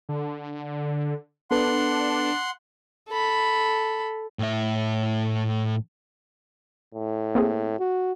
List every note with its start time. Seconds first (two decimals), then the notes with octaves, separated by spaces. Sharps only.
0.09 D3
1.51 B3 D4 A4 B4 F#5 C6
3.10 A4 B5
4.39 A2 E5
6.94 A2
7.35 A#3 C4 G#4
7.79 F#4